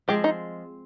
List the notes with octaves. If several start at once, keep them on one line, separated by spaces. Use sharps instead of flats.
F3 G#3 C4 G4
D#4